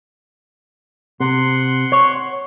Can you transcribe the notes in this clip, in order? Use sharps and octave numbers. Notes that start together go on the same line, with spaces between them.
C3 F#5 C6
C#5